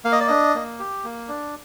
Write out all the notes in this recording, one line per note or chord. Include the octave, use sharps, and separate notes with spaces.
A#3 F5
D#5
D5
D4 D#5
A#3
G4
A#3
D4